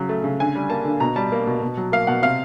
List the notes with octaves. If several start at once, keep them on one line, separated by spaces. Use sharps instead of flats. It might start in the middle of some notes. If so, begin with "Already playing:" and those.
Already playing: C#3 F#3
A3
C#3
D3 G#5
G3
A#3 A5
D3
B2 A#5
G3 A5
A#3
B2
B2
F#3
A#3 F5
B2 F#5
C3 F5